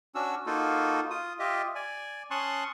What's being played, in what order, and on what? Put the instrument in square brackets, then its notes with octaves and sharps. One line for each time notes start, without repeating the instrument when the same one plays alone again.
[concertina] C#4 D4 F#4 E6
A#3 D#4 F4 F#4 A4
F4 D#6
F4 G4 D#5 E5
D5 G#5
C#4 A5 C6 C#6 D#6 F#6